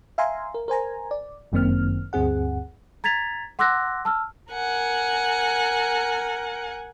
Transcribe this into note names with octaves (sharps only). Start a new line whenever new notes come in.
E5 F5 G#5 A#5 C6
A#4
A#4 C5 G#5 A#5
D5
G1 F#2 D#3 A#3 C4 F6
D2 G2 C4 G#4 F#5
A#5 G#6 A6 B6 F7
F#5 C6 D6 E6 F#6 A#6
A5 E6 F6
A#4 F#5 G#5